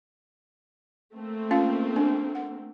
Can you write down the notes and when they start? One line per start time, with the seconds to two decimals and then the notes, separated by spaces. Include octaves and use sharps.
1.15 A3 A#3 C4
1.51 C#4 F4 F5
1.96 D4
2.35 F#5